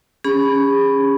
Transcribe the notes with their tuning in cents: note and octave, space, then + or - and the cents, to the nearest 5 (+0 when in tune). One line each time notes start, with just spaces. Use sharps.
C#4 +5 G#4 -35 B5 +0